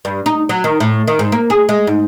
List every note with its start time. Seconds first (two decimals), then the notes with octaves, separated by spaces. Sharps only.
0.05 G2
0.26 D#4
0.49 F#3
0.64 D#3
0.80 A2
1.08 D#3
1.19 G#2
1.32 A#3
1.50 G#4
1.69 G#3
1.87 G#2